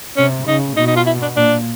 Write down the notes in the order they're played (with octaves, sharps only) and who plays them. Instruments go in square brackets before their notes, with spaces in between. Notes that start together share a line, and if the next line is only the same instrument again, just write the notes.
[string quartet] C3 [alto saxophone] C#4
[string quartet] C#3 [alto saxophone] D#4
[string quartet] B2 [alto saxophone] D#4
[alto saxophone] D#4
F4
E4
D4
[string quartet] A#2 [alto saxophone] D4